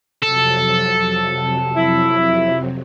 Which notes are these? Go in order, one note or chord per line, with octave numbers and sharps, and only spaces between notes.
F2 C3 F#3 A4
E4